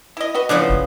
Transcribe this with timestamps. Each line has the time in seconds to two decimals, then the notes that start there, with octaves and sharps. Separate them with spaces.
0.17 E4 D#5
0.34 F#4 B4 D#5
0.49 C#3 F3 B3 D4 E4
0.69 F#1